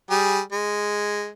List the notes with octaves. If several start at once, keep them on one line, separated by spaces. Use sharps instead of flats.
G3 G#4
G#3